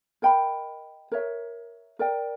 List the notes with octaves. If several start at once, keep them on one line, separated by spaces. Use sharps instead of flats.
A#4 D#5 G5 B5
A#4 C#5 E5
A#4 D5 G5